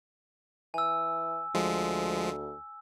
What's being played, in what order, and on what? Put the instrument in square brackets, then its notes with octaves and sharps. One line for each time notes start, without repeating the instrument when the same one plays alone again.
[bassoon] E3 [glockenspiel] G#5 E6
[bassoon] D2 [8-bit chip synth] F3 G#3